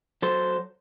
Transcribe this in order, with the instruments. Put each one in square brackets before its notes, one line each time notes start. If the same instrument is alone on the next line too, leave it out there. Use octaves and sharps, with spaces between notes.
[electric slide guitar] F#3 A4 C5